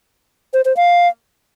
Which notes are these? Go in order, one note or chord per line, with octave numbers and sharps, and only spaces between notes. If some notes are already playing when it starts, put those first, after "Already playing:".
C5
C5
F5